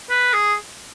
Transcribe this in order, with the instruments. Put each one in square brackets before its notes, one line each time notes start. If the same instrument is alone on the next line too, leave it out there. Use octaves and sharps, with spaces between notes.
[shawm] B4
G#4